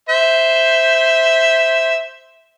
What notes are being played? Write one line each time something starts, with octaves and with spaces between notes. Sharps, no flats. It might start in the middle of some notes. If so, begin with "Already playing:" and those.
C5 E5